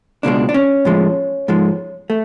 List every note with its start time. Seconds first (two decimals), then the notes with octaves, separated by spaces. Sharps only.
0.23 C#2 B2 G#3 D4
0.49 D4
0.54 C#4
0.85 A2 F3 G#3
1.48 G#2 F3 G#3
2.10 A3